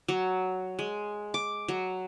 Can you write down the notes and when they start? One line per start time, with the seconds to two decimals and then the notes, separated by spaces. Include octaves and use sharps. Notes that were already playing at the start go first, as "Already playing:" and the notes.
0.08 F#3
0.79 G#3
1.34 D6
1.68 F#3